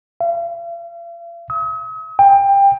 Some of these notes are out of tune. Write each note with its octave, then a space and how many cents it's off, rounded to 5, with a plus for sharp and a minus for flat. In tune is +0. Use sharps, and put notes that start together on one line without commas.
F5 -45
D#6 +45
G5 +20